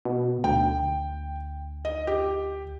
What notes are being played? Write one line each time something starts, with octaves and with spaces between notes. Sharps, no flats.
B2
D2 G5
D#5
G4